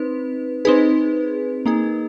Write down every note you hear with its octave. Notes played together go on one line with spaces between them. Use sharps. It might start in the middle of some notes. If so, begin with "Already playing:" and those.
Already playing: C4 D#4 B4
C4 D#4 G#4 B4
A#3 D#4 G#4